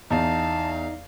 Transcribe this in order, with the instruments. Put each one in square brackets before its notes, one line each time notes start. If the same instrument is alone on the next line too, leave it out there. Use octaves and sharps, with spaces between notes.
[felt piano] E2 [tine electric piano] D#4 [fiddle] F5 [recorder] A5